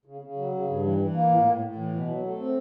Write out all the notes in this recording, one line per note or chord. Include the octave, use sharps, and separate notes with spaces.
C#3
C#3
F#3
C#3
G2
E3
E3
A#3
A2
A2
A2
E3
B2
F#3
A3
C4